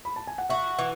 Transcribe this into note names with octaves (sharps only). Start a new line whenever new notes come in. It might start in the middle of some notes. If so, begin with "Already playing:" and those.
B5
A5
G#5
F#5
F#4 E5
E3